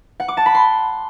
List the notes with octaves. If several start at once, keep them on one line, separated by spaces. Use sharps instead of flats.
F#5
D6
A5
B5
C6